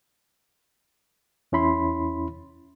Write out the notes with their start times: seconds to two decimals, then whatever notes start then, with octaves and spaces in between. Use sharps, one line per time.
1.52 E2 C#4 E4 B5 C6